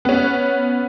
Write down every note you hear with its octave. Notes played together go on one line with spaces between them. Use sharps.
B3 C#4